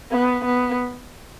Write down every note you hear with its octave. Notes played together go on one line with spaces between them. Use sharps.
B3
B3